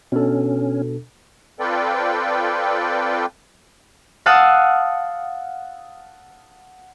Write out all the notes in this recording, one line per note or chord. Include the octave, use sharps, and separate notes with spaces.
B2 C#4 D4 A4
C4 F4 A4 B4 D5 G5
F5 F#5 A5 D#6 E6 F#6